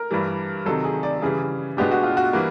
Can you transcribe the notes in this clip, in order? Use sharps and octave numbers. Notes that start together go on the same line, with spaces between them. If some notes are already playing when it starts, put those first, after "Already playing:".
Already playing: A#4
G2 E3 G3
C3 D#3 F#3 A4
G#4
D5
C#3 E3 G3 G#4
B2 G#3 B3 D4 G4
F#4
F4
F#4
E3 G3 A#3